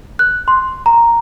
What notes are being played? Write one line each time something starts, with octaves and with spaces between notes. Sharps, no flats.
F#6
C6
A#5